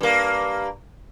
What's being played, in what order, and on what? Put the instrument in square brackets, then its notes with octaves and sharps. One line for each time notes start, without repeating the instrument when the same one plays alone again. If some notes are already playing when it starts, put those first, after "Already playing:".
[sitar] G2 A#3